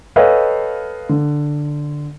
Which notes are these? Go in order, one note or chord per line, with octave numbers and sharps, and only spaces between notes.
A4 B4 C#5 D#5 F5 G5
D3